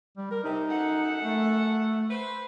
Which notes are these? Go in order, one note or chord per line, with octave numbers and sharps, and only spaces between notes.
G3
A#4
C3 D#4
F#2 A4 F#5
A3
B4 C5